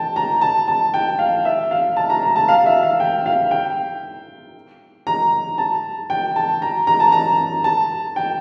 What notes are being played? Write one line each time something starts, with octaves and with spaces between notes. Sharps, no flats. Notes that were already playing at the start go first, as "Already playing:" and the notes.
Already playing: G5 A5
A#5
A5
A5
G5
F5
E5
F5
A5
A#5
A#5
A5
F5
E5
F5
G5
F5
G5
A#5
A5
G5
A5
A#5
A#5
A5
A#5
A5
G5